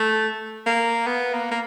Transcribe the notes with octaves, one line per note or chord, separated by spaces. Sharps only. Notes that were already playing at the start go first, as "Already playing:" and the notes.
Already playing: A3
A#3
B3
A#3
A#3